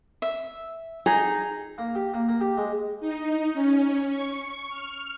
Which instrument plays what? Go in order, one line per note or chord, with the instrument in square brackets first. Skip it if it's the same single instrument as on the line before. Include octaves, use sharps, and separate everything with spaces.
[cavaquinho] E5
[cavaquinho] D#4 [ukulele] G#4
[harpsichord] A#3
G4
A#3
A#3
G4
G#3
[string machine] D#4
C#4
C#6
F6